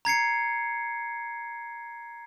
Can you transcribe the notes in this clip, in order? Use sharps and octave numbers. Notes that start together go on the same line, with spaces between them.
A#5 G#6 C7 C#7